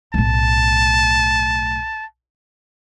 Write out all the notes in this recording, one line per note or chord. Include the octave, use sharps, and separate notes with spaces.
B1 A2 A5